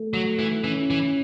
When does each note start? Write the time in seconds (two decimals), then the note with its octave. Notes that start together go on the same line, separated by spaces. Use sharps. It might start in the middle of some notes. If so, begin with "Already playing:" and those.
Already playing: A3
0.14 F#3
0.39 E3
0.64 E3 C#4
0.90 E3